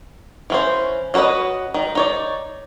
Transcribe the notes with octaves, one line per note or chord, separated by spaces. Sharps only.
E3 C#4 C5
C#4 F#4 A#4 B4 D#5
D#3
D#4 C#5 D5